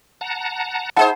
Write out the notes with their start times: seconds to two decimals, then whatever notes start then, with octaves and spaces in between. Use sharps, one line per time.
0.21 F#5 A5 A#5
0.97 D#4 G#4 C5 F#5 A5